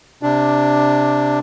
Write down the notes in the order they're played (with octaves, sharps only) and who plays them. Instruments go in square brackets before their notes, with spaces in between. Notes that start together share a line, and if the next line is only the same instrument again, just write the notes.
[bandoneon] C3 D4